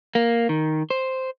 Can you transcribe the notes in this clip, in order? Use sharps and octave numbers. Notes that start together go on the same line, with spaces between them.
A#3
D#3
C5